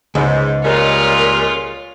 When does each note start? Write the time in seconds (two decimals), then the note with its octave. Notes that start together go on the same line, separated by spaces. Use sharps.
0.15 C#2 G#2
0.64 A#2 G3 G#3 F4 A#4 C#5